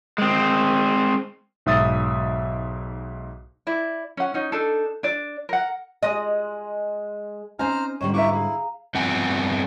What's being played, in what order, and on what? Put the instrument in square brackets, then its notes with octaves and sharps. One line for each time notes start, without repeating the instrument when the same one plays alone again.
[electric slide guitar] G#3 C4
[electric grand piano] B1 G#2 E5 D#6 A6
[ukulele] E4 D5
C#4 F#5
C#4 D#4
D4 D#4 A4
D4 D5
A#4 F#5
[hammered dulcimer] G#3 [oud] D#5
[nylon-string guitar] C4 C#4 D#4 [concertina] C5 A#5 F6 [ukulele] G#5
[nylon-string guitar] G#2 D3 G3 [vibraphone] C#4 G5 [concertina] C#5
[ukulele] E4 B4 E5 [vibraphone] F5 A#5 [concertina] C#6 D6
[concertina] E4 [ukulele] G#4
[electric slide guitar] G2 B3 C4 F#5 G#5